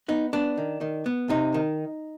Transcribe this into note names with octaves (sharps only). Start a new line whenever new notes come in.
B3 D#4
B3 D4
D#3
D#3
B3
C3 D#4
D#3